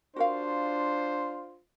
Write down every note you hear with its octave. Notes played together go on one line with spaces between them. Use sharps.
D4 F4 F#4 A#4 C5 F5